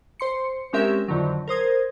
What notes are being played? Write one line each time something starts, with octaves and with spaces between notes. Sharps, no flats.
C5 C6 C#7
G#3 C4 C#4 G4 A#4 E5
F2 D3 D#3 F#3
A#4 C5 D#6 G#6